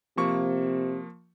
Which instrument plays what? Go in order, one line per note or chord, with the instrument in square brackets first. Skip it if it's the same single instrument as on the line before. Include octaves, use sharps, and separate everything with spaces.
[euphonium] C3 [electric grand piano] F3 A#3 C#6